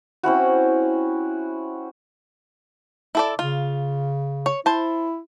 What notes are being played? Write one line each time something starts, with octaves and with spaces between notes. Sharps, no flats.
C4 C#4 E4 F#4
E4 A4 D5
C#3 F4
C#5
E4 C5 A5